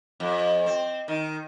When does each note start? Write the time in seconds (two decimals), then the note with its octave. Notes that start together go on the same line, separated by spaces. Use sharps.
0.20 F2
0.66 C4
1.08 D#3